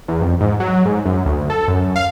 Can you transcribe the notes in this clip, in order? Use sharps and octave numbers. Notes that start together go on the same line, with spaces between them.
E2
F2
G#2
F#3
G#2
F#2
D2
A4
F#2
F5